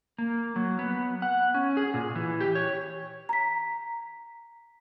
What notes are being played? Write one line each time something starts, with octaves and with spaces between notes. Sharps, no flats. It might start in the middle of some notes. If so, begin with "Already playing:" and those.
A#3
F#3
B3
F#5
C#4
G#4
A#2
E3
G4
C#5
A#5 B6